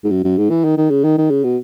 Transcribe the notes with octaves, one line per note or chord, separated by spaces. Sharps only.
G#2
F#2
F#2
G#2
E3
D#3
D#3
C#3
D#3
D#3
C#3
B2